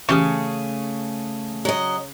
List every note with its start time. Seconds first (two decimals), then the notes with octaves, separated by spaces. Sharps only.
0.09 C#3 E3 A3 G4 G#4 C#6 D#6
1.65 F#3 D#5